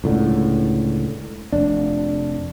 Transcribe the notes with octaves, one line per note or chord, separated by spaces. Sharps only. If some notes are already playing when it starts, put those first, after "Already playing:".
C#2 A2 D3
F1 D4